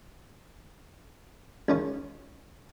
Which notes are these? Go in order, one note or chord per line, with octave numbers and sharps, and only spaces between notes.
C#2 D#3 C#4